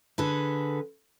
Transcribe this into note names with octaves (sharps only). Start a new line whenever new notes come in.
D3 G#4 A4 B4